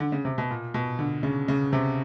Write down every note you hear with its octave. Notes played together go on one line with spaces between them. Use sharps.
D3
C#3
C3
B2
A#2
B2
D3
C#3
C#3
C3